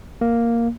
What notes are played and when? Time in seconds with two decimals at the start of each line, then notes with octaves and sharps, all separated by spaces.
0.21 A#3